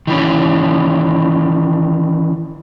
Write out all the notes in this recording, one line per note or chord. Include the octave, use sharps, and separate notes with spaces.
D#3 E3 C#4